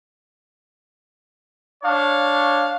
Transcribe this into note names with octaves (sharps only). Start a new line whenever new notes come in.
D4 C#5 F5